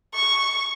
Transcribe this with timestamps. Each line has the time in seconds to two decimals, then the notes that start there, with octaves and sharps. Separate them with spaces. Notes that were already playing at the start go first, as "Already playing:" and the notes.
0.14 C#6